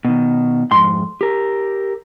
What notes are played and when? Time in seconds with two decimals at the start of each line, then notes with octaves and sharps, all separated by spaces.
0.05 B2 D#3
0.71 F2 G#2 C6
1.21 G4 A#4